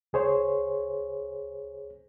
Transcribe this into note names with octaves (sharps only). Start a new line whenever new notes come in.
C#2 G#4 C5 C#5